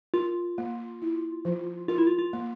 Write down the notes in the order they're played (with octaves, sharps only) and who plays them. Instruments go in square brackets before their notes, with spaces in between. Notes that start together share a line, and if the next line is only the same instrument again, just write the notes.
[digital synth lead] F4 [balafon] A#4
[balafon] A#3
E4
F3
[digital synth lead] F4 [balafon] A#4
[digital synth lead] E4
F4
F4
[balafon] A#3